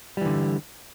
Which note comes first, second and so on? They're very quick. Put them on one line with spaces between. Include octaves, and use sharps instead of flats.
G3 E3 D3